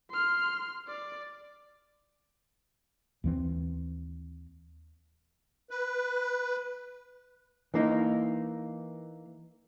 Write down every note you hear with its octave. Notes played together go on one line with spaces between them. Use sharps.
C6 F6
D5
D#2 E3 C4
B4
E3 A#3 D#4